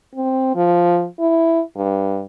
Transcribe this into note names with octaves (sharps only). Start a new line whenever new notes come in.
C4
F3
E4
G2